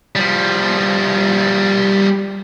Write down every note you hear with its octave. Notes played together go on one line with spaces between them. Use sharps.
F3 G3